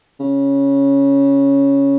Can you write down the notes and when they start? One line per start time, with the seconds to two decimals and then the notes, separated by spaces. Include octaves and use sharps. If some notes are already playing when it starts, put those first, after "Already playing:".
0.20 C#3